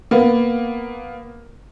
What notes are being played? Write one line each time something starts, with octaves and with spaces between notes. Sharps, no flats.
A#3 B3